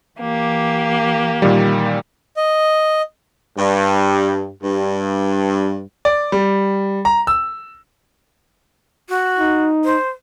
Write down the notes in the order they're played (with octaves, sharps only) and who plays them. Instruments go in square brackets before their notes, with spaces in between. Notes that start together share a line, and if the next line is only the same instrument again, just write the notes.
[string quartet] E3 A#3 G4
[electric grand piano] A#2 D#3 G3
[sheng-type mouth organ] D#5
[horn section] G2
G2
[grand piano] D5
G3
A#5
E6
[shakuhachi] F#4
[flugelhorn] D#4
[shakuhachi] C5